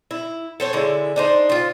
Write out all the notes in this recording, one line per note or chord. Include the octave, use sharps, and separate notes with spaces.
E4
A4 C5 C#5
D3 G#3 E4
D4 D#4 C5
F4 C5